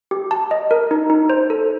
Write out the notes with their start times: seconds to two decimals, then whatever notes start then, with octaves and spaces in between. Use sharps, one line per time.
0.11 G4
0.31 A5
0.51 D#5
0.71 A#4
0.91 D#4
1.10 D#4
1.30 C5
1.50 A4